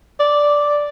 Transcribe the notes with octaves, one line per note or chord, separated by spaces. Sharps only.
D5